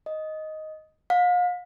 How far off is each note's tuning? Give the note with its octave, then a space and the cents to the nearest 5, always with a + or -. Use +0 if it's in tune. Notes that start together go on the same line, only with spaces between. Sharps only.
D#5 +5
F5 +40